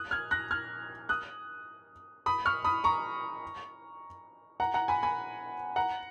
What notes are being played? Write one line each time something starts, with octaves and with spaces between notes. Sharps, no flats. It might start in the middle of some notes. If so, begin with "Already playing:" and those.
Already playing: D#6 F#6
F6 G#6
F#6 A#6
F6 G#6
D#6 F#6
B5 D#6
C#6 F6
B5 D#6
A#5 C#6
F#5 A#5
F#5 A#5
G#5 B5
G#5 B5
F#5 A#5